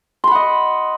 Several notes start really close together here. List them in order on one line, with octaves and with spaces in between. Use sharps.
C6 B5 F#5 D#5